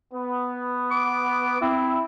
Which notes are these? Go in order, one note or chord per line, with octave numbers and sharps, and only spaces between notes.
B3
D6
C4 E4